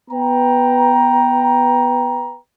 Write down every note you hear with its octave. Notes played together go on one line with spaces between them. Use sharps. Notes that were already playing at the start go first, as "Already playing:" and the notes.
B3 B4 G5 A#5